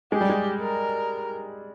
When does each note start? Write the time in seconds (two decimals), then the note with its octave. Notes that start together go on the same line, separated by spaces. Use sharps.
0.12 G#3 G4
0.21 G3
0.30 G#3
0.60 A#4